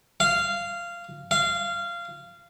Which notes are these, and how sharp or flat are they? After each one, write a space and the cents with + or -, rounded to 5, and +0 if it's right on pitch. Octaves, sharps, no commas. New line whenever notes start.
F5 -15
F5 -20